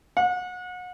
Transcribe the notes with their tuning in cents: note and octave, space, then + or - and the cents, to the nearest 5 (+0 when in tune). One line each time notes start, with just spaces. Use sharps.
F#5 -35